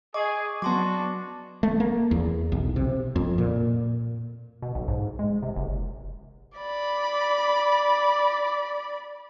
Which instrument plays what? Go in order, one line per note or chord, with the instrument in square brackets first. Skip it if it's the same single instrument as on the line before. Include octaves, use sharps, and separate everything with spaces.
[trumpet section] G#4 [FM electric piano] D#5 C#6 [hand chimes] D6
[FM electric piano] F#3 B3 [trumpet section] D4 F#4 [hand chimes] A5 C6 D6
[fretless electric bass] A3
A#3
E2
B1
C3
F2
A#2
[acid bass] B2
B1
G#2
G#3
C3
F#1
[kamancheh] D5 B5